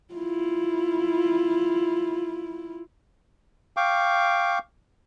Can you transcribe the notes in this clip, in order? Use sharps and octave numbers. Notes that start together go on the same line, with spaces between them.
E4 F4
F5 G5 C#6 D6